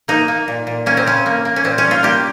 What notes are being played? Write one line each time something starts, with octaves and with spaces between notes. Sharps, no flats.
A#3 D#4
A#3
A#2
A#2
A#3 C#4
C4
C#3 C#4
A#3
A#3
C#4
A#2 C4
C#4
G3
F4
A#3 G4